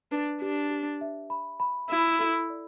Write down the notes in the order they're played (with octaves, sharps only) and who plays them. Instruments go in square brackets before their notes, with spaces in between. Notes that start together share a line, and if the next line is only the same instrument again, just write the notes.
[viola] D4 [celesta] B4
[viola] D4 [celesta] G4
[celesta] G4
E5
B5
B5
[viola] E4 [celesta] B5
[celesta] A4
D5